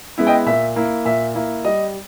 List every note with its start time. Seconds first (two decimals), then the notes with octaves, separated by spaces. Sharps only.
0.18 G#3 B3 E4
0.27 D#5 G5
0.46 A#2 E5
0.76 A#3 E4
1.05 A#2 E5
1.35 A#3 E4
1.65 G3 D#5